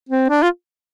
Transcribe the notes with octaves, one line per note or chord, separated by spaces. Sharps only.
C4
D4
F4